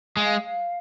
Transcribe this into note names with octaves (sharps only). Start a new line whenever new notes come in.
G#3 F5